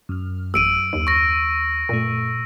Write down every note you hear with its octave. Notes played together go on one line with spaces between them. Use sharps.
F#2 F6
A1 E6 D7 D#7
D#2
C#6 A#6
F#2 A#2 A3